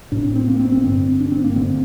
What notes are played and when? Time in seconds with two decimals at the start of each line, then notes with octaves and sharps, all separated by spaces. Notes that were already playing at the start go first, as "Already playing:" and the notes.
0.12 A2 D4
0.24 C4
0.36 C4
0.48 A#3
0.60 C4
0.72 C4
0.84 G2 D3 C4
1.20 D4
1.32 C4
1.44 A#3
1.56 G2 D3 C4